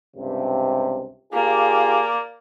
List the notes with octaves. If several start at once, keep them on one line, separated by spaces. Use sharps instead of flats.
C#2 G2 C3
A#3 F4 G4 G#4 D5